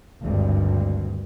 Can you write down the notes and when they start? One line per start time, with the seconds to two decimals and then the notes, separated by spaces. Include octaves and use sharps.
0.22 G#1 D2 G2